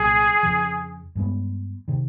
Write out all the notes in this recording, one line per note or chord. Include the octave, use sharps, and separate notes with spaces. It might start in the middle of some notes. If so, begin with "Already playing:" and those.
Already playing: C2 A#2 F#3 G#4
F2 C#3 F3
G2 D#3 G#3 B3
C3 D#3